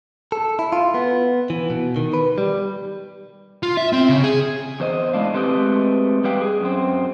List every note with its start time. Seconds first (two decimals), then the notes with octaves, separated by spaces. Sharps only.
0.32 A4
0.59 E4
0.72 F4
0.94 B3
1.50 E3
1.70 B2
1.96 D#3
2.13 B4
2.38 G3
3.63 F4
3.77 E5
3.93 C4
4.09 C#3
4.23 G#4
4.80 E2 C5 D#5
5.13 A2 G#3 D4 F5
5.34 G#3 A3 C4 G4 B4 D#5
6.24 G3 G4 B4 F5 G5
6.42 G#4
6.61 F#2 C4